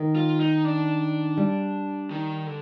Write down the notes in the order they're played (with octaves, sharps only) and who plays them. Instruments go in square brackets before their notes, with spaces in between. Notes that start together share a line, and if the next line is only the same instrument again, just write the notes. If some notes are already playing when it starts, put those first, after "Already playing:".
Already playing: [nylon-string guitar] D#3
[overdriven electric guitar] F4
D#4
D4
[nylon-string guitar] G3
[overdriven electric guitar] D#3
D3